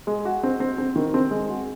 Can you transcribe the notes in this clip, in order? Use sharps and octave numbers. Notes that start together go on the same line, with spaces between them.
G#3
F#4
C4
C4
C4
D#3
C4
G#3
F#4